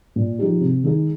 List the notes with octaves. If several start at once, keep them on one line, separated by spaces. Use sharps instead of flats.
A#2
F3 G#3 D#4 G4
C3
D#3 G#3 D#4 G#4